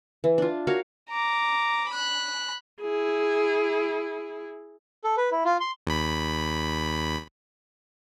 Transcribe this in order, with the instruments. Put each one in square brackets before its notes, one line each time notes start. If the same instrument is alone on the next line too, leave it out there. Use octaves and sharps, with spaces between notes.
[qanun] E3
D4 F4
F#4 A#4 C#5 F5
[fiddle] A#5 D6
B5 F#6
[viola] E4 G#4
[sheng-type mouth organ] A4
B4
E4
F4
C6
[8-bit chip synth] D#2 B5